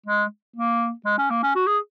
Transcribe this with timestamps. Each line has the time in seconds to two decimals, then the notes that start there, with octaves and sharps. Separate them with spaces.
0.06 G#3
0.56 A#3
1.05 G#3
1.18 C#4
1.30 A#3
1.43 C#4
1.56 F#4
1.67 G#4